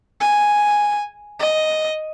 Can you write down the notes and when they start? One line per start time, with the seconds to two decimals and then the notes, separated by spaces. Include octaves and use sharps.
0.20 G#5
1.39 D#5